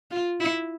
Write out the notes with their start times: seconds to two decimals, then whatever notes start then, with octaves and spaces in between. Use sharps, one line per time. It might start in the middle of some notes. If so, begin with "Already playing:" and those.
0.11 F4
0.40 E4